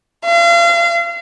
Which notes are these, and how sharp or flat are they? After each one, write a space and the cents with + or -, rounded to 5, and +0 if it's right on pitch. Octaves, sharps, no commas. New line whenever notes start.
F5 -35